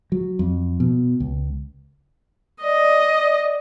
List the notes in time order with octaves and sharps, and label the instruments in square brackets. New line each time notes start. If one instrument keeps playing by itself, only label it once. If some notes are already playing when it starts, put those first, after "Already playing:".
[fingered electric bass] F#3
F2
B2
C#2
[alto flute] D5 [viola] D#5